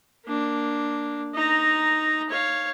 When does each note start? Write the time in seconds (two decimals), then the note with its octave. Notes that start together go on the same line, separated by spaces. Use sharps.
0.26 A#3 D4
1.34 D#4 A#5
2.29 C#5 F5